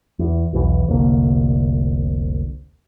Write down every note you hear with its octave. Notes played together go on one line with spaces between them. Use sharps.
E2
B1 E2 B2 E3
F1 C2 D3 A#3